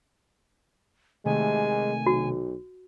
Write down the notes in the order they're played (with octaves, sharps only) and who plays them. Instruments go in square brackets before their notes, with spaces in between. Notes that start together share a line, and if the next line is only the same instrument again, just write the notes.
[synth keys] C3 D#3 A3 [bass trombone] G#3 [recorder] G#5
[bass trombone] B1 [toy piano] F#4